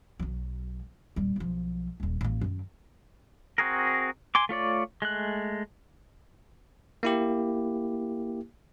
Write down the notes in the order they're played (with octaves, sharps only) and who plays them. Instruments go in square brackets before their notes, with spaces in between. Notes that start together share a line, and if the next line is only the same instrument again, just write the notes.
[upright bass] B1 F#3
D#1 G3
B1 F3
D#1 D#2
A1 A#3
F#2 D#3
[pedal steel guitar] C4 F#4 G#4 A#4
G#5 C6 D6
A3 F4 C#5 D5
G#3 A3 F#6
[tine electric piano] A#3 E4 G4